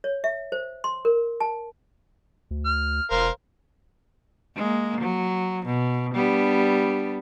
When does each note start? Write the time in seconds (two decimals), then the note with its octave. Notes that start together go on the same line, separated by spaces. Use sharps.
0.04 C#5
0.24 E5
0.52 C5
0.84 C6
1.05 A#4
1.40 A5
2.51 D2
2.65 F6
3.11 E1 A#4 C5 F5
4.56 G#3 A#3
5.01 F#3
5.66 B2
6.14 G3 B3 D4